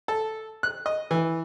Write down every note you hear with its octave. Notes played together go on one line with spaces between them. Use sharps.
A4
F#6
D#5
E3